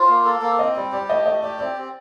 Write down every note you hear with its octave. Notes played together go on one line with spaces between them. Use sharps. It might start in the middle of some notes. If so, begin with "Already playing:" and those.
Already playing: F4 C5
A#3
A4
A#3
C4 D#5
G3 D5
G4 D5
A3 D#5
A3 D#5
G4 D5
C4 D5
C4